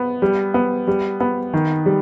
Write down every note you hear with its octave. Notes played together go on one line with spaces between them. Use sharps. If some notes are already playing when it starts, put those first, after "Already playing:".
Already playing: B3
G3
B3
G3
B3
D#3
G3